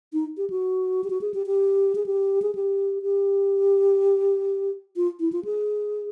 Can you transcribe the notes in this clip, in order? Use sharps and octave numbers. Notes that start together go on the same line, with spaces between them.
D#4
G4
F#4
G4
F#4
G#4
G4
G4
G#4
G4
G#4
G4
G4
F4
E4
F4
G#4